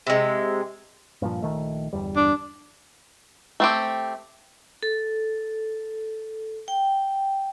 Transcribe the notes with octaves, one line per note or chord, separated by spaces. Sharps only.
C3 G#3
G2 A#2 F3
A#1 D#3 A3
G1 E2 G3
D4
A3 C4 G4
A4
G5